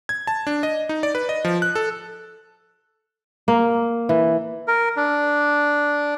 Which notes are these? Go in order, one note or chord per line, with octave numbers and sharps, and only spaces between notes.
G#6
A5
D4
D#5
D#4
D5
B4
D#5
F3
F#6
A4
A#3
E3
A#4
D4